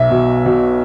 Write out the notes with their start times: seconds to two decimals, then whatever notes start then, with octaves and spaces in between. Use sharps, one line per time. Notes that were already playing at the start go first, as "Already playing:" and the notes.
Already playing: B1 E5
0.10 B2
0.45 B2